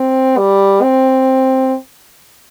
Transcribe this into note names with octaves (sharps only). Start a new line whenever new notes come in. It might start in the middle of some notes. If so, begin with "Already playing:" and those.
Already playing: C4
G3
C4